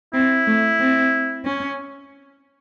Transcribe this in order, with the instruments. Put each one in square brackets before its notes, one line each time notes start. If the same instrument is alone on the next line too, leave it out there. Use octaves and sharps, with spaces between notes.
[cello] C4 [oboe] E4
[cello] A3
C4
C#4